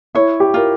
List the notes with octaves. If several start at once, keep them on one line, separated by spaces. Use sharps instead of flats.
E4 C#5
G4
F4 A#4